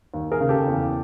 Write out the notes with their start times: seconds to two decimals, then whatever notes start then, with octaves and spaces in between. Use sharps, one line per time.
0.14 D#2
0.31 G#4 A#4
0.41 C#3
0.49 G4 A4
0.68 E2